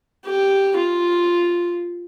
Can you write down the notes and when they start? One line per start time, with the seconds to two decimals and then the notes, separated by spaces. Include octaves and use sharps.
0.25 G4
0.77 F4